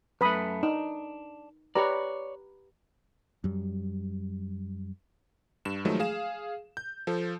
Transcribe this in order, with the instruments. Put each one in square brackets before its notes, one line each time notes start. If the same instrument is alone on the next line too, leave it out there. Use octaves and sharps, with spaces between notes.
[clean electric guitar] F#2 A3 [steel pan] B4 B5 D#6
[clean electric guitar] D4 [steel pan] D#4
[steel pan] G4 B4 A#5 [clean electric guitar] C#5 D5
[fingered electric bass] F#2 G3
[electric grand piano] G2 E7
D#3 F3 F#3 G#3 A3
G#4 F5 E7
G6
F3 A4